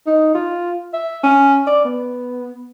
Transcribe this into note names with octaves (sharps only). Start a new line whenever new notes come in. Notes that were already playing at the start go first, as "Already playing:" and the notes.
D#4
F4
E5
C#4
D5
B3